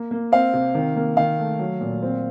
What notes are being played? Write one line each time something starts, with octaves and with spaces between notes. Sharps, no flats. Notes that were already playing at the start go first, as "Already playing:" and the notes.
Already playing: A#3
A#3
C4 F5
C3
D#3
A#3
D#3 F5
A3
F#3
A#2
C4